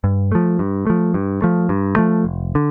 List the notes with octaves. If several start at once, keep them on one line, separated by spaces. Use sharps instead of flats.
G2
F3 A3
G2
F3 A3
G2
F3 A3
G2
F3 A3
F1
D3